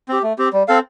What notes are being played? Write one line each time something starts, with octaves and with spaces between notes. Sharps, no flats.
C4 G4
A3
C4 G4
G3
C4 A4 F5